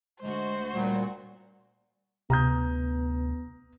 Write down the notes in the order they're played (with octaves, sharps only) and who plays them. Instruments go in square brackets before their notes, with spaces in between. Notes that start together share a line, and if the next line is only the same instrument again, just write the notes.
[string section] D2 F#4 [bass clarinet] G#3 [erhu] C5
[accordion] A#2 F#3 [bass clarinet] G3
[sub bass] D2 [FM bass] C3 [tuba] B3 [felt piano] A#5 D#6 G6